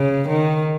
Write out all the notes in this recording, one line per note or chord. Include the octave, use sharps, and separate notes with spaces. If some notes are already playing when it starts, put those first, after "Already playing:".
Already playing: C#3
D#3